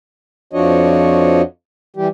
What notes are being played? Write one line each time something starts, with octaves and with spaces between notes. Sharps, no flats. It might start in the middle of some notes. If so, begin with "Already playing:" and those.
F2 F3 D4 F#4 C#5 D#5
E3 G3 G4